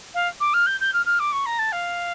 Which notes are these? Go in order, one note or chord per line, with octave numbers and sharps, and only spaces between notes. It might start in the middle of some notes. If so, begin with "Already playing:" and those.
F5
D6
F6
G6
G6
F6
F6
D6
C#6
A#5
A5
F5